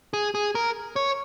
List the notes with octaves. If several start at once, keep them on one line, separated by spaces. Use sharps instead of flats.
G#4
G#4
A#4
C#5